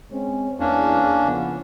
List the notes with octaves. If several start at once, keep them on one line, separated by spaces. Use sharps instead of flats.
G#3 C4 C#4
E2 A#3 C#4 D4
C#3 F3 B3